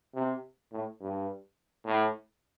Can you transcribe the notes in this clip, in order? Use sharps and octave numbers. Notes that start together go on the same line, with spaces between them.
C3
A2
G2
A2